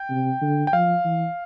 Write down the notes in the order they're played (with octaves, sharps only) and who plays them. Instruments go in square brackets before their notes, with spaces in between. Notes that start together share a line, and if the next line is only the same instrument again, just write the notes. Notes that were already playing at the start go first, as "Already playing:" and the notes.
Already playing: [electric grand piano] G5
[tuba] C3
D3
[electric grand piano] G5
[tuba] F3 [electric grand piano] F5
[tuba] E3